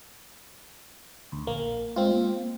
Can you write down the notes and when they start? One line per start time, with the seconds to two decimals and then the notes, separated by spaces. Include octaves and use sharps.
1.32 D2
1.47 A#1 A#3
1.96 G#3 C4 F4
2.14 A#3